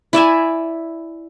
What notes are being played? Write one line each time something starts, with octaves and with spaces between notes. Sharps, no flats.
E4 D5 E5 G#5